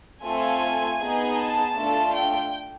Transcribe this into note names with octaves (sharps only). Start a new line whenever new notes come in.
A3 C4 F4 A4 G#5
B3 D#4 G#4
A5
A3 D4 F4 A4
G5